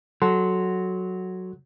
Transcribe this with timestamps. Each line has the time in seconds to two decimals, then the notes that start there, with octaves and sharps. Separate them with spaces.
0.22 F#3 A4 F#5 C6